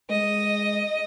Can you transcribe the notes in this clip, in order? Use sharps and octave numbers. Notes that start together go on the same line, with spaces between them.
G#3 D#5